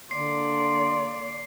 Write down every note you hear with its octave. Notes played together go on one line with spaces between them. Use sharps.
D3 A#3 D5 C6 C7